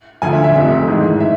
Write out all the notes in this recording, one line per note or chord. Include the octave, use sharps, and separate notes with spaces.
D2 D3 F3 G#5
E5
E5
F1 F2 C3 F3 E5
G#1 G#2 E3 G#3
E5